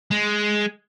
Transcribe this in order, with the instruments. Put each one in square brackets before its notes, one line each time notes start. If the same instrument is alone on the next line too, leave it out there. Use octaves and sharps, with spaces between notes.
[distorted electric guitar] G#3